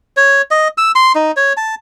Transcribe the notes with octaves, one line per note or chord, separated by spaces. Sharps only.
C#5
D#5
E6
C6
D#4
C#5
A5